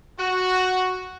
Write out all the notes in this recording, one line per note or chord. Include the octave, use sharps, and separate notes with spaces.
F#4